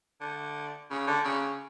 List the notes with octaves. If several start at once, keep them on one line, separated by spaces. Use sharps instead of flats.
D3
C#3
D3
C#3